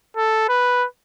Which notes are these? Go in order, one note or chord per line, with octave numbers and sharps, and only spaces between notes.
A4
B4